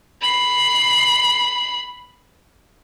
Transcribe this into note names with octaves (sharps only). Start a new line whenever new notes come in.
B5 C7